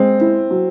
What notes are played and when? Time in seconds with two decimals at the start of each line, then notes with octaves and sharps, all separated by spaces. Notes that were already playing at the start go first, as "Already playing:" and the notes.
Already playing: G#3 C4
0.21 E4
0.51 F#3